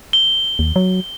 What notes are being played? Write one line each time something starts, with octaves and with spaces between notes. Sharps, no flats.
G7
D#2
F#3